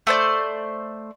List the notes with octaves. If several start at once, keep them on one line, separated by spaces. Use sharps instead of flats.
A3 C5 D5